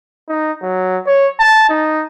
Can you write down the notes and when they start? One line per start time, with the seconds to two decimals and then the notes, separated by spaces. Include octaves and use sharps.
0.29 D#4
0.62 F#3
1.07 C#5
1.40 A5
1.70 D#4